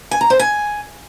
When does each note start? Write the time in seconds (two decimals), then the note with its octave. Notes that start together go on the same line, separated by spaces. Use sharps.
0.11 G#5
0.21 A#5
0.30 C5
0.39 G#5